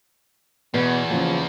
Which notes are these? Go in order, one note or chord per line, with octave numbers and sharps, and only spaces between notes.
E2 B2 B3
D#2 C#3 F3